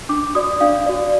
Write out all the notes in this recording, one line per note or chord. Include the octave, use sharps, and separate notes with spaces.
D4 D6
F#4 D5 D#6
D4 F5
F#4 D5